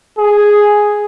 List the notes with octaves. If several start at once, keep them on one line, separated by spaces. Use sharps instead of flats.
G#4